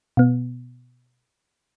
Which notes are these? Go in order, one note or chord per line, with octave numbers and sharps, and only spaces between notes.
B2 B3